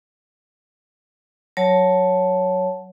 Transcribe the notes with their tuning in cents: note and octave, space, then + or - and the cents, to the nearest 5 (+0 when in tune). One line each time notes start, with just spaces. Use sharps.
F#3 +0 C#5 +0 A5 +0